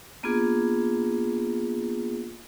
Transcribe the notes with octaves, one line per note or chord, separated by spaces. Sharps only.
A#3 B3 D4 F4 G#4